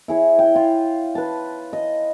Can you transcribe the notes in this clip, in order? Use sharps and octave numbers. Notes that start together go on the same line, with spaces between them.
E4 G#4 C#5
G5
F4
B4 A5
D#5